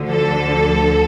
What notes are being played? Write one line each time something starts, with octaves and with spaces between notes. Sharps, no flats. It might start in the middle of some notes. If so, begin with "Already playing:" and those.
Already playing: D2 D3 F3
A4